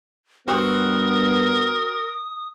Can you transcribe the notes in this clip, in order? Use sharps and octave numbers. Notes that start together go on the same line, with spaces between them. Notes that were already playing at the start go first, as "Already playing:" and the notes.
G2 B3 C4 F#4 A#4 D#6